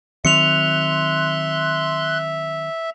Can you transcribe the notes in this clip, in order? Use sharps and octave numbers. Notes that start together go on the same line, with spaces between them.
D#3 F#3 C4 E5 C6 F#6 C#7 F7